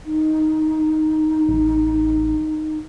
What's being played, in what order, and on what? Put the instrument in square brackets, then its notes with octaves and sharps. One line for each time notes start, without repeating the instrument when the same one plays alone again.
[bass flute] D#4
[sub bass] A1